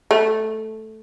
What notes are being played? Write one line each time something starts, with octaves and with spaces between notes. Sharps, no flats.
A3